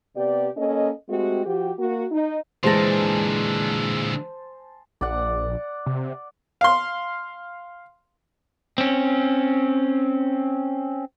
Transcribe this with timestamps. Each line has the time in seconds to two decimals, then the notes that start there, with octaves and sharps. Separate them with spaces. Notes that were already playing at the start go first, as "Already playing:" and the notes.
0.16 C3 B3 G4 D5
0.57 A#3 C#4 A4 D#5
1.09 G#3 A3 C4 F#4 G4
1.46 F3 F#4 G4
1.79 A#3 F#4
2.12 D#4
2.63 A#2 D3 E3 G#3 C5 G#5 A5 A#6
5.01 A#1 D5 F#5
5.86 C3
6.61 F5 C6
8.78 C4 C#4